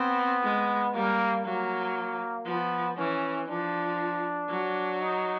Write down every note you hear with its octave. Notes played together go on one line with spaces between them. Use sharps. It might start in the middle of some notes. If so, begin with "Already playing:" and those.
Already playing: B3 C4
G#3
G3 A#3
F#3 A#3
F3 B3
E3 C#4
F3 D4
F#3
D#4